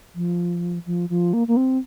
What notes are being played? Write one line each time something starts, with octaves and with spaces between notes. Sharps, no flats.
F3
F3
F3
A#3
A#3
C4